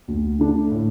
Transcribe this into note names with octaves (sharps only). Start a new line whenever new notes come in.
D2
D3 A3 D4
A2